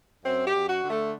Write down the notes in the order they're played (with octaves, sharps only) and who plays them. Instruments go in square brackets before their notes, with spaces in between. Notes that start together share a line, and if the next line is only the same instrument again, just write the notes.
[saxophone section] F#2 C4
G4
F#2
F#4
D3
A3